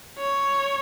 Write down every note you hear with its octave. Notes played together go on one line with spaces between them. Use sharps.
C#5